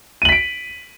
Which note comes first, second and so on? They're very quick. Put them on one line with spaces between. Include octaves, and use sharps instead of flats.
D#7 F#7 B6 D7